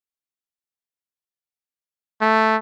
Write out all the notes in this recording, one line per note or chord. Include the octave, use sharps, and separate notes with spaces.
A3